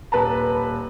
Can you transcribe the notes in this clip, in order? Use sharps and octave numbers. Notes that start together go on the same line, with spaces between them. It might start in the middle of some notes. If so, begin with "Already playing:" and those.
D#1 B4 A5 A#5